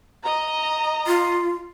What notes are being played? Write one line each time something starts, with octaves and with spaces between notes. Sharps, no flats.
D#5 A#5
F4